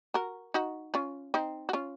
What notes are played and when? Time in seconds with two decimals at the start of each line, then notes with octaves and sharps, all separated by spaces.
0.14 F#4 A#4
0.54 D#4 F#4
0.94 C#4 F4
1.34 C4 D#4
1.69 F#4
1.73 C#4 F4